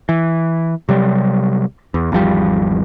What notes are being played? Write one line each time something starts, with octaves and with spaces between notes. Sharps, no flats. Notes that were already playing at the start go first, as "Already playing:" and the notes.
E3
C3 F#3 G3
E2
G#1 E2 F3 G3